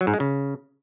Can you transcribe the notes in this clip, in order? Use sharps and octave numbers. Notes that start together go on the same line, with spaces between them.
F#3
G#2
G#3
C#3